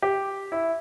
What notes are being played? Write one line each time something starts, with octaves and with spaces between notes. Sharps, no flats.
G4
E4